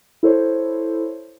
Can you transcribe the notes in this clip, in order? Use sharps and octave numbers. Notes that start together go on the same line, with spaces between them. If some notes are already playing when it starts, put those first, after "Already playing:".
E4 A4 C5 C#5